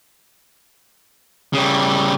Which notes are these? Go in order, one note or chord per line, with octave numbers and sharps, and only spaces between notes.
C#3 G3